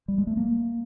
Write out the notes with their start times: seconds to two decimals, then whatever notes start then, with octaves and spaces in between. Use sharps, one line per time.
0.08 G3
0.18 G#3
0.27 A3
0.37 A#3